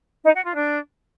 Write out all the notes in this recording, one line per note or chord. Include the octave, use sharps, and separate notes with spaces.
D#4
F#4
F4
D4